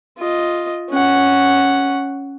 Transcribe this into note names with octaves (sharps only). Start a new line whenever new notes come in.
F4 D#5
C#4 F#5